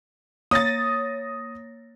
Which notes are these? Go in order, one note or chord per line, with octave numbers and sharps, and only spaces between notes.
A#3 C#5 D#6 A6 A#6